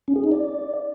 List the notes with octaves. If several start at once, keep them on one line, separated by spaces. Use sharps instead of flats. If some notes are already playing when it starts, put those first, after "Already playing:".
C#4
G#4
D#4
D5